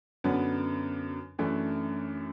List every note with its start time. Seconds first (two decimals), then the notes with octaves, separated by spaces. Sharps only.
0.24 F#2 D3 F#3 B3 D4
1.38 F#2 E3 A3 D4